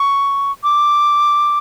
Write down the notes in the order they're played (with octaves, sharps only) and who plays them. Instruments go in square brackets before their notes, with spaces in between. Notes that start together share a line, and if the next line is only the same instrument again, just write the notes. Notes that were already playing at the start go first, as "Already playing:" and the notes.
Already playing: [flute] C#6
D6